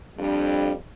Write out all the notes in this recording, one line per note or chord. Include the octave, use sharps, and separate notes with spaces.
F2 G3 D4